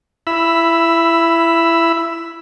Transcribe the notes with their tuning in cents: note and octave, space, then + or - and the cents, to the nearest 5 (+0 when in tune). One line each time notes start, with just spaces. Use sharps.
E4 +20 B5 +0 E6 +5